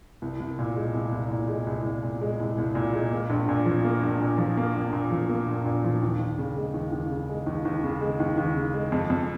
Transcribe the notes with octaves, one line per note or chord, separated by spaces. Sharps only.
C2
C2
A#2
G#3
C2
C2
A#2
G#3
C2
C2
A#2
G#3
C2
C2
A#2
G#3
A#3
A#1
A#2
F3
A#3
A#1
A#2
F3
A#3
A#1
A#2
F3
A#3
A#1
A#2
F3
D#2
D#2
C#3
G#3
D#2
D#2
C#3
G#3
D#2
D#2
C#3
G#3
D#2
D#2
C#3
G#3
F2
F2